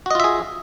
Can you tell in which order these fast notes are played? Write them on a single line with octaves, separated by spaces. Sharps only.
F#4 D#5 F4 E5 G#4